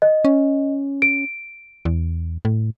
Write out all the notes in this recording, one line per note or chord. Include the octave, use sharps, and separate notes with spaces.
D#5
C#4
D7
E2
A2